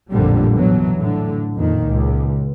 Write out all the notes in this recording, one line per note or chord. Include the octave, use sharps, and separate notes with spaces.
A1 F2 A#2 D3 G3
B2 E3 F#3
A2 D3
F2 A#2 D#3
C#2